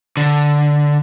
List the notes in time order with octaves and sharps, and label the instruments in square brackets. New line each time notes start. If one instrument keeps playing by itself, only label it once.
[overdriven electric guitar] D3